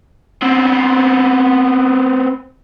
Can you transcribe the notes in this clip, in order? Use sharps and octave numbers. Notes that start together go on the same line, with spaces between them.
B3 C4